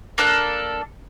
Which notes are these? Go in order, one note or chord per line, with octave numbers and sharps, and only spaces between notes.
A#3 D4 A4 F#6